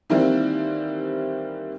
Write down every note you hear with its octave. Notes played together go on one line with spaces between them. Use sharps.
D#3 E3 G3 A#3 C4 E4